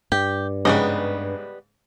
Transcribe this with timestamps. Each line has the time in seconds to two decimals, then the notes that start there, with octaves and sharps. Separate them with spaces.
0.12 G2 G4
0.65 G#2 C#3 G3 B3 D#5